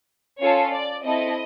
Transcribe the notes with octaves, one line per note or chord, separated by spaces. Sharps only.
C#4 F4 A4 C#5
D5
C4 E4 A4 D#5